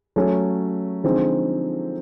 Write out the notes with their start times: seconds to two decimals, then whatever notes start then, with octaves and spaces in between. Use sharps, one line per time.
0.16 F#3 A3 C#4
1.04 D3 F3 G#3 C4 D#4